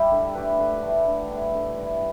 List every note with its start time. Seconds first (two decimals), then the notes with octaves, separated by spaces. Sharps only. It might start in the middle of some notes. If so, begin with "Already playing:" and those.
Already playing: G3 E4 G4
0.12 D3
0.35 A3 G4 B4
0.59 D3
0.82 A3 G4 B4
1.07 D3
1.30 G3 E4 B4
1.54 D3
1.78 G3 E4 B4